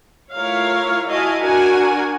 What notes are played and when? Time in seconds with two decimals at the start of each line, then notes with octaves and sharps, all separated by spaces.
0.35 A3 E4 F4 A#4 C#5 F5
1.08 E4 F#4 D#5 F5 G#5 A5
1.41 D4 F#4 A#4 F#5 G#5